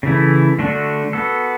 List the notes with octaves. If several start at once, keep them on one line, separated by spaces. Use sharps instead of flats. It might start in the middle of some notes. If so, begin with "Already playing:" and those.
C#3 E3 A3 E4
D3 A3 D4 F#4
B3 F#4 A4